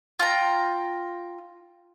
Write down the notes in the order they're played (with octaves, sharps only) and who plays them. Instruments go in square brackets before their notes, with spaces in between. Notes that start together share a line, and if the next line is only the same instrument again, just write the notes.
[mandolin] F4 G5 A#5